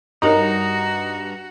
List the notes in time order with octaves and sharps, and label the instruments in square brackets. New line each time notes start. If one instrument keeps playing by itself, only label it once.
[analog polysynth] G2 A#5 [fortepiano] D#4 [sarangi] F#4 [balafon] G4 A#4 C#5